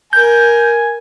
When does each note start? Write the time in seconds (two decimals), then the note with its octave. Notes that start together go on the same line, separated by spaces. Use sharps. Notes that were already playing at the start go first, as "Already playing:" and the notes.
0.13 A#4 G#5 G6